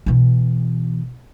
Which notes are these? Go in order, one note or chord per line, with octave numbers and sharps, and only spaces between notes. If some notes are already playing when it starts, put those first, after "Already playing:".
B2 E3